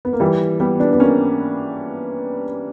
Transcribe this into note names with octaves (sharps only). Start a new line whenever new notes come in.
B3
A#3
E3 G3
G3 B3
B3 D4
B3
A#3 C#4